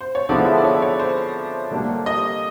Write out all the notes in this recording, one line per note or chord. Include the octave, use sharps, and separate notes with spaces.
C5
C#5
D3 F3 G#3 B3 E4 D5
E5
D5
C#5
C#5
C5
D3 G3 A#3 D4 G4
D#5